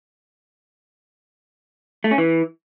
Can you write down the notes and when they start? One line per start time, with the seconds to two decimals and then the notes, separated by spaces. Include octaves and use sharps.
2.04 A3
2.11 C#4
2.18 E3